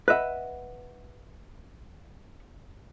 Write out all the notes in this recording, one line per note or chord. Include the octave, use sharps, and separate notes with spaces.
B4 D#5 E5 F#5